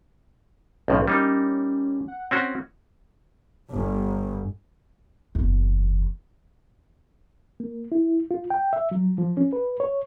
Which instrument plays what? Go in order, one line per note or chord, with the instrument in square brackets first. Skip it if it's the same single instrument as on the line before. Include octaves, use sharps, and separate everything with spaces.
[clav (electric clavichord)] B1 A2 F3 [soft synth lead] C#4
[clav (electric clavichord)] G3 A#3 D#4
[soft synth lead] F#5
[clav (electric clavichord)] C4 C#4 F#4
[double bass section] G1
[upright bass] F#1 E2
[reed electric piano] A#3
E4
F4
G5
E5
F#3
F3
C#4
B4
C#5